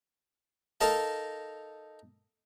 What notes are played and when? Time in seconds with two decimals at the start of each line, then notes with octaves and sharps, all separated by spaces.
0.81 D#4 A4 A#4 D#5 F5 A5